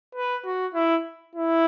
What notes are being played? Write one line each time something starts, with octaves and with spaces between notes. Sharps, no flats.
B4
F#4
E4
E4